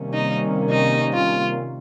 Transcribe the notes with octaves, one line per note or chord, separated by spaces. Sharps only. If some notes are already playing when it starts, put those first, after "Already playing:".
Already playing: C3 D#3 G3 A#3 C#4
D#4
D#4
F4